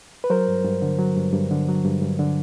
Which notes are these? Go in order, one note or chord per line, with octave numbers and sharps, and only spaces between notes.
B4
F#3 A#4 C5
G2
G2
D3
F#3
G2
G2
D3
F#3
G2
G2
D3